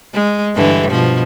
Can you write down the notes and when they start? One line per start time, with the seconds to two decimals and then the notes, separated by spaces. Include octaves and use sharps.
0.14 G#3
0.55 G2 D3 E3
0.90 B2 F3